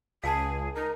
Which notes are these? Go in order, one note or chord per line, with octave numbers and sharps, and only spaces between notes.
C#2 G#4 F5 G#5 A5
D#4 A#4